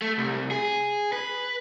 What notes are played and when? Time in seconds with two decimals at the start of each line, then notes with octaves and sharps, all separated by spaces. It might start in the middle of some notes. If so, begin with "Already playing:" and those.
0.02 A3
0.18 C2
0.51 G#4
1.13 B4